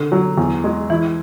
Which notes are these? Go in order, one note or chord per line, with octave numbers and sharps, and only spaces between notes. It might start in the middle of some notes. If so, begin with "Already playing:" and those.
Already playing: D3
F#3
E2
G#3
E3 E4